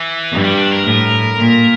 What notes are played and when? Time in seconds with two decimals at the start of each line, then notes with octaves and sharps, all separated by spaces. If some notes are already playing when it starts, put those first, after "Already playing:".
Already playing: E3
0.32 G2
0.44 G3
0.58 D4
0.71 A#4
0.84 A2
1.38 A#2